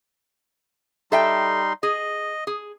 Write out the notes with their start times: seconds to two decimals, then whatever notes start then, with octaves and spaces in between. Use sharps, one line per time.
1.12 G3 D#4 A4 E5 G5 C6
1.83 G#4 D#5
2.47 G#4